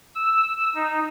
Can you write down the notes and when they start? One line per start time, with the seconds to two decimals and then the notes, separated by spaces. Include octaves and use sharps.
0.15 E6
0.75 D#4